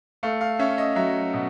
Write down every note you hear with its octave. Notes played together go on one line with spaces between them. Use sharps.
A3 F5
F5
C#4 E5
D#5
F#3 E5
B2